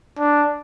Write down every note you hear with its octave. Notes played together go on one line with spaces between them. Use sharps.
D4